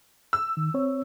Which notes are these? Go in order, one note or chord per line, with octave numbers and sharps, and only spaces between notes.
E6
D#3
C4 C#5